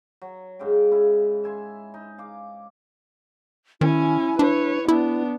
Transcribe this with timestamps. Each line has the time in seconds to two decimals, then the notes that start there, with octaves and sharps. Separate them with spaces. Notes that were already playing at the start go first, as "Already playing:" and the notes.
0.22 F#3
0.59 G#2 C#3 F5 G5
0.91 C#3 E4
1.44 E5 G#5 C6
1.94 D#4
2.18 F5 D6
3.81 D#3 C#4 E4 G#5
4.39 D4 B4 C#5
4.88 B3 D4 E4